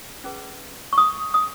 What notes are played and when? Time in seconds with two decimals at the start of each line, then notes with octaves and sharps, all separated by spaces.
0.24 C#4 G#4 B4
0.93 C#6
0.98 D#6
1.34 D#6